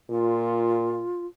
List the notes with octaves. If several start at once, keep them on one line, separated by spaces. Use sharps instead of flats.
A#2 F4